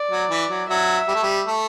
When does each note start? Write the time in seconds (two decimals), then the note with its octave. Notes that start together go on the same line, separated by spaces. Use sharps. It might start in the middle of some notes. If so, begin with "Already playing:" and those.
Already playing: D5
0.11 F#3
0.30 E3
0.49 F#3
0.68 F#3 E5
1.08 G3
1.15 A3
1.23 G3
1.47 A3